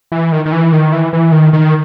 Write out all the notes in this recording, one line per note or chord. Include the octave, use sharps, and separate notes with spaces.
E3
D#3
D#3
E3
D#3
E3
E3
D#3
D#3